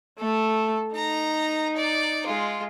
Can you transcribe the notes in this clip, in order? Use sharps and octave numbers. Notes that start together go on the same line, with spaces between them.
A3 A4
D#4 A#5
D5
G#3 F4